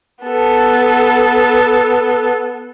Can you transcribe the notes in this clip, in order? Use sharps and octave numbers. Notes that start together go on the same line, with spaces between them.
B3 A4